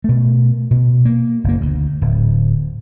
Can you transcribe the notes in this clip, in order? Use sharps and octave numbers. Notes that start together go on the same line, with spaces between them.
B2 A3
B2
A#3
F#1 A#3
D2
D1